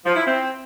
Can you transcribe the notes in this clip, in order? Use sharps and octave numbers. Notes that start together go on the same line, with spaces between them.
F3
E4
C4